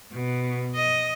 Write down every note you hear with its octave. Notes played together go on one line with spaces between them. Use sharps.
B2
D#5